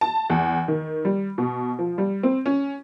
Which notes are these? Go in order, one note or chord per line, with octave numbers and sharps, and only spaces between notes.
A5
E2
D#3
G3
B2
F3
G3
C4
C#4